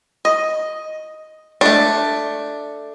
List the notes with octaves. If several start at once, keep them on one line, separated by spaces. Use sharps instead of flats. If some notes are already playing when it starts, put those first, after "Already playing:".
D#5
A3 D4